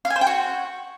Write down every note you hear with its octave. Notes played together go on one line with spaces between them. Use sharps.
F5
G#5
C5
G5
F#4